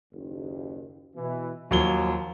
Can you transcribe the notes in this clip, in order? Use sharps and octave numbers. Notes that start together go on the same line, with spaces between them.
F#1 D#2
B2 E3
D#2 F3 F#3 G7